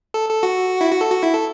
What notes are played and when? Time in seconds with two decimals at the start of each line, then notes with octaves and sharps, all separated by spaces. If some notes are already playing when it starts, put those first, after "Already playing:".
0.14 A4
0.29 A4
0.43 F#4
0.81 E4
0.91 F#4
1.01 A4
1.12 F#4
1.23 E4
1.34 A4